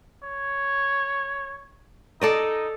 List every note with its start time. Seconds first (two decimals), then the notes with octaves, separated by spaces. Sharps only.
0.23 C#5
2.22 D#4 A4 D5 D#5